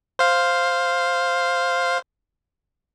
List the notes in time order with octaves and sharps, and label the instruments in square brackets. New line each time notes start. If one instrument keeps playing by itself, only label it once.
[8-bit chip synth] C5 F5